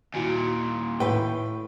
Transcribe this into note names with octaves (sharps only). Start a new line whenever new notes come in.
D#2 A#2 E4 F#4 G#5
A2 B4 G5